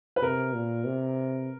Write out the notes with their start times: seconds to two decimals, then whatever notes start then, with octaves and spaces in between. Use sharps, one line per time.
0.16 B4
0.23 C3 A#4
0.54 A#2
0.86 C3